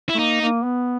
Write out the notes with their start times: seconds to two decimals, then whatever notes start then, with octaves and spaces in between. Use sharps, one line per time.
0.09 E4
0.15 A3
0.19 A#3 D#4
0.41 A#3
0.63 B3